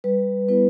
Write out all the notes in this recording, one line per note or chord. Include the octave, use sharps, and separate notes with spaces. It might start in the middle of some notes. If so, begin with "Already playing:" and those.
G3 B4
B3 E4 B4